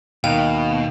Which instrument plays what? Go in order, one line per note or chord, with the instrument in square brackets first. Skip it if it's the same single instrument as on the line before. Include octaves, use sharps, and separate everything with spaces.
[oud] D#2 [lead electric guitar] B2 [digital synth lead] F5 [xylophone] G5